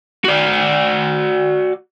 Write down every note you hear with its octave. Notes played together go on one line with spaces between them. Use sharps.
F#4 D5